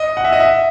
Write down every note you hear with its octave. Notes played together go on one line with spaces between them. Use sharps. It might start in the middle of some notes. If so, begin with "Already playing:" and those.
Already playing: D#5
F#5
E5
D#5
E5